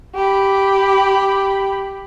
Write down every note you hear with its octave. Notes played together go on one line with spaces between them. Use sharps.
G4 B5